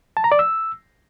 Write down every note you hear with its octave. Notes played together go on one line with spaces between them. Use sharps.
A5
A#5
D5
E6